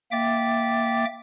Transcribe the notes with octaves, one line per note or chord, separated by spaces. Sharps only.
A#3 E5 G5 D6 A6